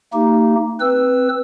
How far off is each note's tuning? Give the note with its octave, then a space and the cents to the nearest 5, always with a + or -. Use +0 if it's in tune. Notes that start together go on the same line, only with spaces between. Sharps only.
A#3 -40 D#4 +0 G4 -10
C4 +0 B4 +0 E6 +0